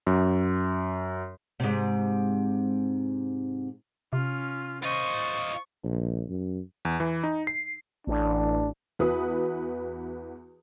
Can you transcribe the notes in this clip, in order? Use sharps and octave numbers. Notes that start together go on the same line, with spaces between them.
F#2
G#2 C3
C3 C#4 F4
F4 C5 D#5 C#6
A#1
F#2
E2
E3
D#4
C7
A1 D4
E2 E4 F#4 B4 D#6